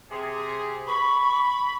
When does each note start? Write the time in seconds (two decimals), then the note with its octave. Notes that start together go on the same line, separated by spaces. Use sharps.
0.11 C3 G#4
0.87 B5 C#6